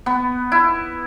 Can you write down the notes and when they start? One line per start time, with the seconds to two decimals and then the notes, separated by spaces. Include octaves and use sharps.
0.06 B3
0.52 E4